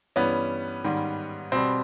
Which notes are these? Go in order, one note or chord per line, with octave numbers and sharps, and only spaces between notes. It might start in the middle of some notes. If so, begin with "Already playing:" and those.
G2 E3 G3 B3 C#4
G#2 D#3 G3
B2 G3 C4